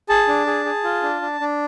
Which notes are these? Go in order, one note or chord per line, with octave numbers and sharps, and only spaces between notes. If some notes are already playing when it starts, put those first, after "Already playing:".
G#4 A5
D4
G#4
G#4
F4
D4
D4
D4